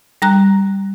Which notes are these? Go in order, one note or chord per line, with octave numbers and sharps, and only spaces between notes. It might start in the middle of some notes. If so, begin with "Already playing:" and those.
G3 A#5 F#6